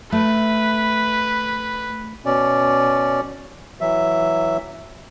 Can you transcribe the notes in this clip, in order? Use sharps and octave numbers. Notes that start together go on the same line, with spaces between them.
A3 B4
B2 C#4 D5
E3 F#3 E5